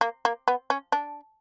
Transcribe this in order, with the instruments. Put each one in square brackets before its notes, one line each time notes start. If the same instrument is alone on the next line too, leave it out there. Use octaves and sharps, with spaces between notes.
[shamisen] A#3
A#3
B3
C#4
D4